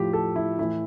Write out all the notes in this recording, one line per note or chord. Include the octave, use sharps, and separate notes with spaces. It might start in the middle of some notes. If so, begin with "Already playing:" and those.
Already playing: A2 F3 G4
A4
E4
A2 E3 E4